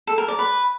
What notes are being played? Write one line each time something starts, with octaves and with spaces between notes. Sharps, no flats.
A4
A#4
D5
B4